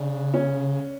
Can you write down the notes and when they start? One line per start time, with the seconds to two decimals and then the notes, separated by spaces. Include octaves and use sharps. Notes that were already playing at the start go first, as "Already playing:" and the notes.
Already playing: C#3 D4
0.34 C#4